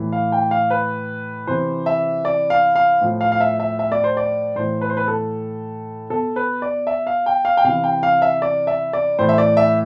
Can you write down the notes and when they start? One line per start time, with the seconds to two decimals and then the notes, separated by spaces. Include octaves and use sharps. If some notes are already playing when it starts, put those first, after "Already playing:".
Already playing: A2 E3
0.12 F5
0.32 G5
0.51 F5
0.70 B4
1.47 C3 E3 C5
1.86 E5
2.25 D5
2.50 F5
2.75 F5
3.01 A2 F3
3.21 F5
3.32 F5
3.40 E5
3.60 E5
3.79 E5
3.92 D5
4.04 C5
4.17 D5
4.56 A2 E3 C5
4.81 B4
4.90 C5
4.97 B4
5.08 A4
6.10 B2 A4
6.36 B4
6.62 D5
6.87 E5
7.07 F5
7.26 G5
7.45 F5
7.57 G5
7.64 C3 E3 F5
7.84 G5
8.03 F5
8.22 E5
8.42 D5
8.67 E5
8.93 D5
9.19 A2 E3 C5
9.29 E5
9.38 D5
9.57 E5